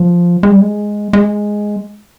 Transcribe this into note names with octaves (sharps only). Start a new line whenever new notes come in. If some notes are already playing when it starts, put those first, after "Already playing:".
Already playing: F3
G#3
G3
G#3
G#3